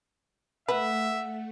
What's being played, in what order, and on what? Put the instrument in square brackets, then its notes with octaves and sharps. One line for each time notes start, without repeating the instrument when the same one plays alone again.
[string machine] A3 [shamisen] B4 [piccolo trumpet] E5 [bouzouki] F#5